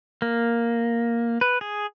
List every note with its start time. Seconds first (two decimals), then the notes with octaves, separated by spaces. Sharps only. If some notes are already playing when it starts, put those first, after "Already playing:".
0.22 A#3
1.41 B4
1.61 G#4